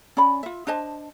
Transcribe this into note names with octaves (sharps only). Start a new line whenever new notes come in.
C#4 D5 B5
F4 E5
D4 C5 D#5 A5